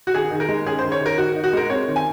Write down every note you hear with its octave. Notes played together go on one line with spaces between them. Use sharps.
F#4
D#3 G#4
D#3
A#4
G#3
C#4 G#4
C5
D#3
C#5
D#3 A#4
D#3 F#4
D#4
F#4
G#3 A#4
C4 C#5
D#3
G#5